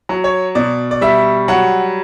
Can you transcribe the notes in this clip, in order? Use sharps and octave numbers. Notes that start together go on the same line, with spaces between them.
F#3
C#5
B2 D5
D5
G3 E5
F#3 F#5